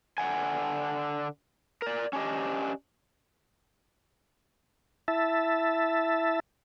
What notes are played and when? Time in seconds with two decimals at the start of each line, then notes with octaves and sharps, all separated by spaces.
0.18 D3 F#5 G#5
1.82 A#4 D5
2.13 C#4 D4 G4 D#5
5.08 E4 E5 A5